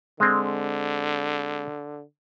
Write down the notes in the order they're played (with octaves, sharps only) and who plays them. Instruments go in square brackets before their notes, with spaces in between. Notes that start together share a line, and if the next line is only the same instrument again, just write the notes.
[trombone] D3 [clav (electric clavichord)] G#3 C4